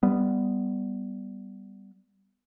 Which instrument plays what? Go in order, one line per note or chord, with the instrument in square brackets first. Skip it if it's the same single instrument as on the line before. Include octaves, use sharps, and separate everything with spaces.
[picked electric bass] G3 B3